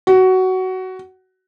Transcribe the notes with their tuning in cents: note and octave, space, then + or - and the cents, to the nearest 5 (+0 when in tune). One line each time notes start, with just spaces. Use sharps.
F#4 +15